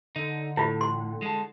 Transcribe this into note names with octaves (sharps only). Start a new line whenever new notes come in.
D3 D#4
A2 E4 F4
C6
G#3 A5